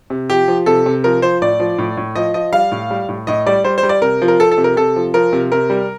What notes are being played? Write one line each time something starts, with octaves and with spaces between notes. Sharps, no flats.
C3
F3 G4
F3
C3 A4
C3
F3 A#4
F3 C5
A2 D5
F3
A2
A2
F3 D#5
F3 D#5
G3 F5
A2
G3
A2
A2 D#5
G3 D5
G3 C5
C5
G3
D5
C3 A#4
F3
A#4
F3 A4
A4
C3
A#4
C3 A4
F3
F3 A#4
C3
C3 A#4
G3